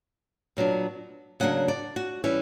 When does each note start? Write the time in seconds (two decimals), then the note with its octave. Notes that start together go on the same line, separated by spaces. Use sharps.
0.57 A#2 F#3 B3 D4
1.40 C#3 F#3 A#3 D4 F#5
1.68 D5
1.96 F#4
2.24 E3 G3 C#4 E4